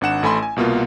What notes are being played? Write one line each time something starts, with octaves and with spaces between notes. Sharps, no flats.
G#1 D4 F#5 E7
A1 A3 G#5 B5 C6
G#5
C2 B2 A#3 F4